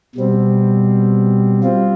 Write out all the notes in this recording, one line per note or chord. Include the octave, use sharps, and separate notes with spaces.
B2 G3 C4
G3 C4 F4